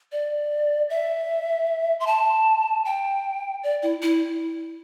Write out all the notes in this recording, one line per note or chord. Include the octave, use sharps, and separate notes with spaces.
D5
E5
C6
A5
G5
D5
E4
E4